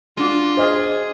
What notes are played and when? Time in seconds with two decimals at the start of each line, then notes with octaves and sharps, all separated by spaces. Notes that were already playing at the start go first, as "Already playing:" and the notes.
0.17 G#3 D4 F4 F#4
0.57 G#4 C5 D#5 F6